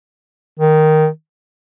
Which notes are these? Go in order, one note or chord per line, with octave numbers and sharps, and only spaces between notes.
D#3